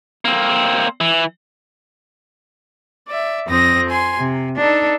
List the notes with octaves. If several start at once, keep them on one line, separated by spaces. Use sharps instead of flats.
A#3 C4
E3
D5 E5
F2 C4 D#6 A#6
G#5 C6
C3
D4 D#4 A4